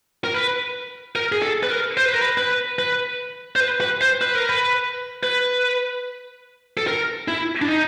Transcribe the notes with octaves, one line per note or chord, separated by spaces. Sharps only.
A#4
B4
A#4
G#4
A4
B4
A#4
C5
B4
A#4
B4
B4
B4
C5
B4
B4
C5
B4
A#4
B4
B4
A4
A#4
E4
D4
D#4